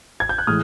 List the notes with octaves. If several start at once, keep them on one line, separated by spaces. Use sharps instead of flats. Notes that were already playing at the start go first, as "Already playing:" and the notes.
G#6
G6
F#6
A2 E3 G#3 D#6 F6